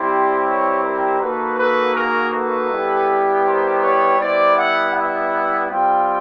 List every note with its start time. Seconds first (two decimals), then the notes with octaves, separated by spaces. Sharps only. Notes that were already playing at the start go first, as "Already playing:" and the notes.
Already playing: G3 C4 E4 G4 C5 D5
0.46 B4 C#5
0.83 A#4 C5
1.21 A#3 D#4 F#4 A4 B4
1.59 A4 B4
1.95 G#4 A#4
2.33 A4 B4
2.70 G3 B3 E4 G4
3.45 A#4 C5
3.82 B4 C#5
4.19 G3 B3 E4 C5 D5
4.56 E5 F#5
4.94 E5 F#5
5.68 G3 C4 F4 F5 G5